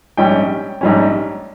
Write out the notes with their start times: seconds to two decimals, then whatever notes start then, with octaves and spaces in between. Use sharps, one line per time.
0.17 A#1 G#2 G3 C#4 G5
0.81 A#1 G#2 G3 C#4